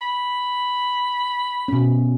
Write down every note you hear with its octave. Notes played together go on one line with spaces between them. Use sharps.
B5
B2 C#4